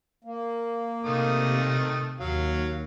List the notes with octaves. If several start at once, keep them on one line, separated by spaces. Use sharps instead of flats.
A#3
C3 D#3 A3 D#6
D#2 F#3 F5